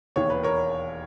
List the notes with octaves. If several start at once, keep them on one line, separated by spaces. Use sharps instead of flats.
E1 D#2 D#3 C#5
B4
A#4 C#5